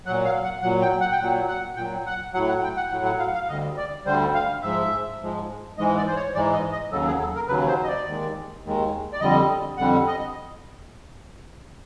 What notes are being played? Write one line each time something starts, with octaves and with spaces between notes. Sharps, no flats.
A#2 F#3 F#5
F5
F#5
A#2 F#3 F#5
G5
F#5
G5
A#2 F#3 F#5
F#5
A#2 F#3 G5
F#5
A2 F#3 F#5
F#5
G5
F#5
A2 F#3 F#5
F#5
F5
F5
D2 D3 G3 D#5
D5
D2 D3 G3 C5
F5
G#2 F3 G#3 E5
G#2 F3 G#3
G#2 E3 G#3 D#5
D5
C5
C#5
G#2 E3 G#3 D5
D#5
D#5
D#2 C#3 F#3 A4
G#4
A4
A#4
D#2 C#3 F#3 B4
C5
D#5
D5
D#2 D#3 G#3
D#2 D#3 G#3
D5
F2 D3 G3 D#5
F2 D3 G3 F#5
D#5